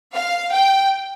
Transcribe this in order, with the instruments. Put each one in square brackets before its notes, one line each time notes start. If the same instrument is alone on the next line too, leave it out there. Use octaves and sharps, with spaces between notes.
[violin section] F5
G5